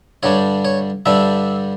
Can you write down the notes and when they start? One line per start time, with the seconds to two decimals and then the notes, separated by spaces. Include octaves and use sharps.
0.23 G2 D3 G3 D4 C#5
0.65 C#5
1.06 G2 D3 G3 D4 E5